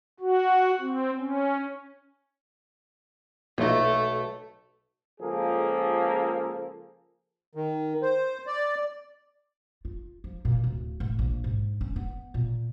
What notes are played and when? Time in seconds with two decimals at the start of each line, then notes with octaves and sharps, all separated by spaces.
0.20 F#4
0.81 C4
1.17 C#4
3.58 B1 A#2 F3 A3 D#4
5.21 C#2 F3 A#3 G#4 A4
7.55 D#3
8.02 C5
8.47 D5
9.85 F4
10.24 F3
10.45 A#2
10.64 D1
11.00 A2
11.19 A#1
11.44 G#2
11.81 C#4
11.96 B3
12.34 A#2